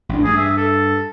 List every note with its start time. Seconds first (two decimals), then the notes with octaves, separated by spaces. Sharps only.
0.09 A1 D4
0.25 G2 G#4
0.37 E5
0.57 A4